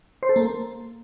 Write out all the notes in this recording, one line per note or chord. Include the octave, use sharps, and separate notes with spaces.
C5
A4
A#3